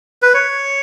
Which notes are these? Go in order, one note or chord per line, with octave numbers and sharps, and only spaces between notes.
B4
C#5